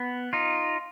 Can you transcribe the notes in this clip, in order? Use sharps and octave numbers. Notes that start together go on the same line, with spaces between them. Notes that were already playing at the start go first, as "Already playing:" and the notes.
Already playing: B3
D#4 F4